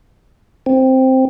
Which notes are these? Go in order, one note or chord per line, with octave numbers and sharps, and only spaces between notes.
C4